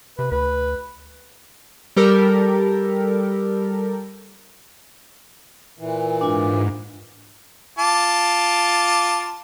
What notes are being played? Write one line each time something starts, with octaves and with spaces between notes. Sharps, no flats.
C3 B4
D2 B4
G3 G4 A4 A#4
A#2 E3
G#2 D4 F4
F4 A5 D6